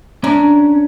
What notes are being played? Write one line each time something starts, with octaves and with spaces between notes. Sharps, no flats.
C#4 D4 A#5